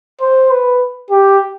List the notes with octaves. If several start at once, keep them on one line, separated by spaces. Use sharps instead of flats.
C5
B4
G4